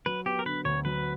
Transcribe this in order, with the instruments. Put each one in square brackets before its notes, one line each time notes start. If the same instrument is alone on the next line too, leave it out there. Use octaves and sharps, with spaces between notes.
[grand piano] F#3 [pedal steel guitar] B4
[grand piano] B3 [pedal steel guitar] G4
[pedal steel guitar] A#4
[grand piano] D3 [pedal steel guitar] B4
[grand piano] D2 [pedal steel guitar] C#5
[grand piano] F#3 [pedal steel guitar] B4